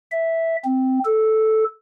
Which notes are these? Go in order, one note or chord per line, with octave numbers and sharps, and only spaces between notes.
E5
C4
A4